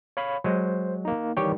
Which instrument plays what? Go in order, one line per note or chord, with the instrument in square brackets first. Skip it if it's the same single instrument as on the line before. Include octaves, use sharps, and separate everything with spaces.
[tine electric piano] C#5 F5 B5
[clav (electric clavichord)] F#3 G#3 [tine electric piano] C5
[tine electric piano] A#3 D#4
[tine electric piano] D#3 E3 G3 [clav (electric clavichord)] G4 C#5 G5